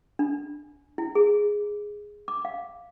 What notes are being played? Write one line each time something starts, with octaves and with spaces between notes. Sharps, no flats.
D4
E4
G#4
D6
F5